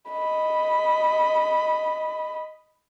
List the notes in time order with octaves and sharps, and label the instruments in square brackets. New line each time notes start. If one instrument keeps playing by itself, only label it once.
[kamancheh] D#5 B5